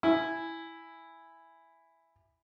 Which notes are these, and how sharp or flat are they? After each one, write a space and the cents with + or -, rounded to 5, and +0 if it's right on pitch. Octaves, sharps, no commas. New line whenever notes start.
E4 +0 G#5 -5